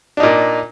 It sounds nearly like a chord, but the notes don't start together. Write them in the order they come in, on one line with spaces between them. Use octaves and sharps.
D4 D#4 A#2